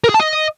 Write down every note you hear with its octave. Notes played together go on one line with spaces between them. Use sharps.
A#4
G#4
A5
D#5